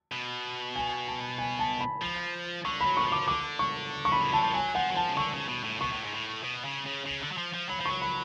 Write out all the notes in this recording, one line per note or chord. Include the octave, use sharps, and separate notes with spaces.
B2
G#5
A5
G#5
A5
B5
F3
D3 C#6
F#3 B5
D3 C#6
F3
D6
D3 D6
C#6
C#6
B5
C#3
D3 A5
F3
F#3 G#5
F3 F#5
F#3
F3 A5
C#3
D3 C#6
C#3
B2
A2
B2 C#6
A2
G#2
A2
B2
C#3
C#3
C#3
D3
F#3
F3
F3
F#3 B5
F3
F#3 C#6
B5